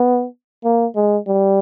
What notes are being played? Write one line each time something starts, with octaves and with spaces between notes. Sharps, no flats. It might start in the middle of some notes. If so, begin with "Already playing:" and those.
Already playing: B3
A#3
G#3
G3